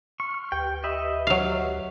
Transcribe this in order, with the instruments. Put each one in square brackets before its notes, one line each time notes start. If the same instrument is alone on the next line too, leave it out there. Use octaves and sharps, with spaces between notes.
[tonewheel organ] C6 F6 [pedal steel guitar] C#6
[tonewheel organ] D2 G4 B4 [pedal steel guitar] G5
[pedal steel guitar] D#5 E5 B5
[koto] F#3 F5